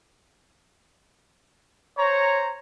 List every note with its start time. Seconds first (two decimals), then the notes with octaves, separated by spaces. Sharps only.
1.98 C5 C#5 A#5